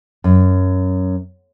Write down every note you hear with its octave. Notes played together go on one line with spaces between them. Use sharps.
F#2